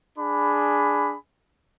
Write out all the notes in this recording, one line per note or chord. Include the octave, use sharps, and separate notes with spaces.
D4 G#4 B5